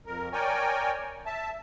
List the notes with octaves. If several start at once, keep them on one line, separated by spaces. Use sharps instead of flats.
F2 A#4
A#4 C#5 D5 G5 G#5
E5 A5